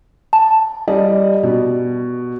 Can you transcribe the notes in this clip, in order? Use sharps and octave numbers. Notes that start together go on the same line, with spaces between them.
A5
G3 D5 D#5
B2